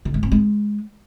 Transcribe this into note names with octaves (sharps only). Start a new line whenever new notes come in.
D3
G#3
C4
G#3